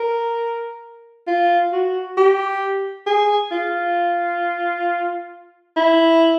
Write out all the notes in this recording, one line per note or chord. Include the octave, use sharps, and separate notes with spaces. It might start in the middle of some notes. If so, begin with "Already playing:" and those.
Already playing: A#4
F4
F#4
G4
G#4
F4
E4